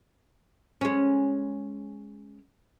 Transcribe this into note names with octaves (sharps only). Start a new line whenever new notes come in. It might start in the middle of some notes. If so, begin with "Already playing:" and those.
G#3 C#4